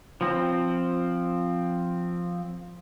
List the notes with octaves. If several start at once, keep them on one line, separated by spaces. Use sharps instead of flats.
F3 C4